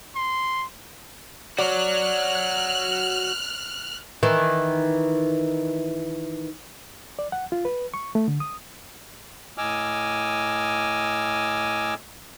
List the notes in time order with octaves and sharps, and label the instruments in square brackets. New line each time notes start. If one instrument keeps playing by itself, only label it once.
[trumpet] C6
[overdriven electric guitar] F#4 C#5 [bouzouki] D5 [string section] F6 F#6
[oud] D#3 E3
[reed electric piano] D5
F#5
F4
B4
C#6
A3
D3
D#6
[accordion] A2 D#5 G#5 D6 E6 F6